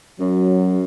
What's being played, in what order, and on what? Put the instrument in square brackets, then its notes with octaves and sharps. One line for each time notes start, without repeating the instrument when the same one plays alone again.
[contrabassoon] F#2 [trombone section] F#3